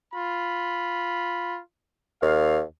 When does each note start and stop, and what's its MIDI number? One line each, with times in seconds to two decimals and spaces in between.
0.14 1.60 65
0.14 1.60 83
2.22 2.61 39
2.22 2.61 77